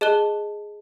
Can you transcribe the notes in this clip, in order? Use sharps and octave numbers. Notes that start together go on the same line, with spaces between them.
G#4 D#5 A5 F#6 G7